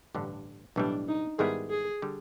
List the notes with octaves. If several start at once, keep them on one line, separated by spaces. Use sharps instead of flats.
A1 G2 D3
B1 A2 E3 G3 D4
D#4
G#2 D#3 G3 B3 E4 G#4
G#4
D3 G3